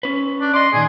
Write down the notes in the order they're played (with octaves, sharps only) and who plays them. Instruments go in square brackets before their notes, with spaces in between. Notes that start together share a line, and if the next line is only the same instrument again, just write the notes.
[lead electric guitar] C#4 B4
[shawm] D4
[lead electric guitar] D5 D#5 [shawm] C6
[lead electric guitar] A#2 D#3 [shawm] G#4